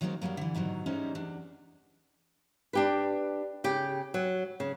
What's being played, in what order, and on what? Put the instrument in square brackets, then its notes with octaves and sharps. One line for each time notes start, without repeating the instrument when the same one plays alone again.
[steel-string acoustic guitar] D#3 F#3 G#3 A#3 C4
F#2 B2 F#3 G3 A#3
D3 E3
G#2 B2 D#3 F#3
G3 G#3 C#4 D#4 E4 C5
E2 D4
[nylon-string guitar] D4 G4 B4
C#3 G4
F#3
C#3